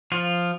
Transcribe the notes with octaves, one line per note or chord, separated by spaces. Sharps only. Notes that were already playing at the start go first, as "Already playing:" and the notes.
F3 F4